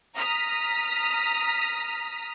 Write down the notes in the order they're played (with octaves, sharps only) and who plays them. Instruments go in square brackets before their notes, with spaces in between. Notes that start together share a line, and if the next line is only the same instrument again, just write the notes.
[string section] A#5 D#6 F6 B6